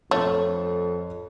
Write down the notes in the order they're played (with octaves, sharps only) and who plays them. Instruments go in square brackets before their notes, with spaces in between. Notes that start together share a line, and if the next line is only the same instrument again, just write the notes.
[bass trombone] F2 [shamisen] A3 [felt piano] A4 C#5